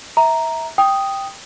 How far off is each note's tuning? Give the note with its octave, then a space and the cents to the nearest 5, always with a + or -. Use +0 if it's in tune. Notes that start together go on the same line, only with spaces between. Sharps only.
E5 -20 A#5 +0
G5 +0 D#6 +0